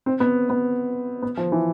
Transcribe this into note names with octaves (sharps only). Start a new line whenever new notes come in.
C4
B3
B3
B3
F3
E3